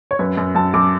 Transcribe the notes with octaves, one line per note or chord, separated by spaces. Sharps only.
C#5
F#2 B4
F#2
F#2 A5
F#2 D6